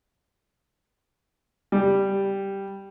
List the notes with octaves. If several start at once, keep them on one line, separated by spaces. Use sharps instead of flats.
G3